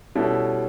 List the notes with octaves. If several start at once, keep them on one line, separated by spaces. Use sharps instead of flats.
B2 G3 C#4 E4 A4